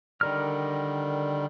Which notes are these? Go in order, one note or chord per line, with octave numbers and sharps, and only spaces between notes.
D3 D#3 G3 A#4 F6